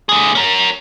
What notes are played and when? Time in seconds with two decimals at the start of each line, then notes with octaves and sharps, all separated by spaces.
0.09 D3 G#4
0.35 C#4 A#4